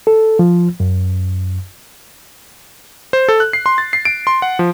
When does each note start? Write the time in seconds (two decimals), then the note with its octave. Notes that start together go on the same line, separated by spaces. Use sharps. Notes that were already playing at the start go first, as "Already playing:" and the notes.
0.07 A4
0.39 F3
0.80 F#2
3.13 C5
3.29 A4
3.40 F#6
3.53 C7
3.66 C6
3.78 A6
3.93 C7
4.05 D7
4.27 C6
4.42 F#5
4.59 F3